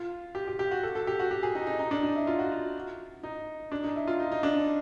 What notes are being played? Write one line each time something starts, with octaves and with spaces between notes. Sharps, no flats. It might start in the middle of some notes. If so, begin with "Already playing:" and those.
Already playing: F4
G4
G4
G4
F#4
A4
A4
G4
F#4
G4
G#4
D#4
D#4
D#4
D4
D#4
E4
F4
F#4
F4
D#4
D4
D#4
E4
F4
D#4
D#4
D4